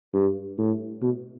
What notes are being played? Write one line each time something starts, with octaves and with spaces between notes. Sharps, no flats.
G2
A2
B2